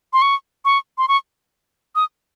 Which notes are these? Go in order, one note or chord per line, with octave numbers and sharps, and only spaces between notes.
C6
C#6
C#6
C6
C#6
D#6